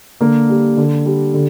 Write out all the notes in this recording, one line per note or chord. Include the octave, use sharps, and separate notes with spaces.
D3 A#3
G3
D3
G3
D3